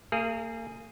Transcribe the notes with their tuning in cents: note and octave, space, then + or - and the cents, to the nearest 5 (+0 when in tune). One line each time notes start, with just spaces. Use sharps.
A#3 -40 G#4 +0